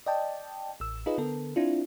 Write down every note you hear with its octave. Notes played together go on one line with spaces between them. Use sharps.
D5 D#5 G5 A5
A1 E6
D#4 F4 G#4 B4 D#5
D3 B3 A4 A#4
C4 D4 E4 F4